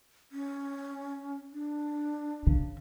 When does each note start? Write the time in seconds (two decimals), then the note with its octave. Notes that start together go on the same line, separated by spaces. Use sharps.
0.32 C#4
1.53 D4
2.47 C#3